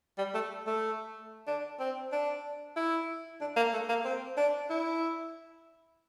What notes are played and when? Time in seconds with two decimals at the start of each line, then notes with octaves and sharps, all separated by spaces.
0.18 G3
0.34 A3
0.67 A3
1.47 D4
1.79 C4
2.12 D4
2.76 E4
3.41 D4
3.56 A#3
3.73 A3
3.89 A#3
4.05 C4
4.37 D4
4.70 E4